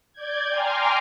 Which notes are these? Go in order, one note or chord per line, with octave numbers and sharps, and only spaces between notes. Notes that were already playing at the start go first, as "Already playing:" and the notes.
D5 G6 G#6
G5 G#5 A#5 C6 D6 F6